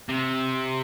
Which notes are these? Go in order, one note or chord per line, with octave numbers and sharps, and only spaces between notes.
C3